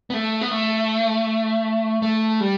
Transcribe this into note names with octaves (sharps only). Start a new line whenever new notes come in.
B3
A3
B3
A3
A3
G3